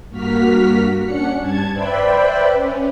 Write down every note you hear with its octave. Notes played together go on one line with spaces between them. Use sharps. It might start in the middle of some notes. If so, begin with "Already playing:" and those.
G2 A#3 F#4 F6 B6
C#4 D4 F#5 C#7
G2 A5 G#6
B4 C5 D5 E5 G5 B5
C#4